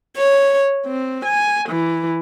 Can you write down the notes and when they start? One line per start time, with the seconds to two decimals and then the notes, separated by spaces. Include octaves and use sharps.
0.17 C#5
0.86 C4
1.25 G#5
1.69 E3